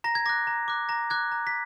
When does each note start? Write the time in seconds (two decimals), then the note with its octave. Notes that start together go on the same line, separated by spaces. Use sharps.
0.04 A#5 A#6
0.15 G#6
0.26 D6 F#6 A#6
0.47 A#5
0.68 D6 F#6
0.89 A#5 A#6
1.10 D6 F#6 G#6
1.32 A#5
1.47 B6